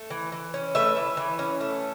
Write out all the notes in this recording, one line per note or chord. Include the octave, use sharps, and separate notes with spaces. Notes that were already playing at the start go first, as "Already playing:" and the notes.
Already playing: A3
E3
E3
C#4
A3 B4 E5
E3
E3
C#4
A3